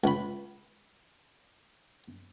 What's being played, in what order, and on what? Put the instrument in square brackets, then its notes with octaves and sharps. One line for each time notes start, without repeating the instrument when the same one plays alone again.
[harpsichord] C#2 B5